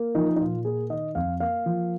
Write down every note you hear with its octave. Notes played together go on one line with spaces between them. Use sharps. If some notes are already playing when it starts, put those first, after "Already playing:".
Already playing: A#3
F3 D#4
D#4
A#2 F4
A#3 G#4
D#3 D#5
F2 F5
A#3 F5
F3